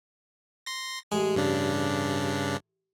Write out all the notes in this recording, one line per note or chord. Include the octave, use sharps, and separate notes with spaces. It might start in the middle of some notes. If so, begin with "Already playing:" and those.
C6 A#6
A1 G#3 G#4
G2 C#3 D4